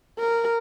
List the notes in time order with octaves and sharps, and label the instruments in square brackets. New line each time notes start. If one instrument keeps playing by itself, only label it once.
[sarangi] A#4